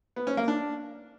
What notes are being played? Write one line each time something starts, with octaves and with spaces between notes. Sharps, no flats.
B3
C#4
A#3
D4